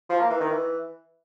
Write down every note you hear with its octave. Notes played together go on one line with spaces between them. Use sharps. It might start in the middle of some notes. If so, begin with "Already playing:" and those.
F3
A#3
E3
D#3
E3